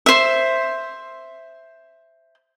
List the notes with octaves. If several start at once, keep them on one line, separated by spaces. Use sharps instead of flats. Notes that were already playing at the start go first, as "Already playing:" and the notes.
C5 E5